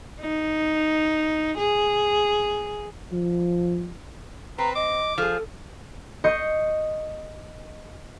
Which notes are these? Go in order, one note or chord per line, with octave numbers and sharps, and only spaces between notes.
D#4
G#4
F3
C4 B4 A#5
D#5 D6
F3 G#4 A4
D#5 C#6 G6 C7 C#7 D#7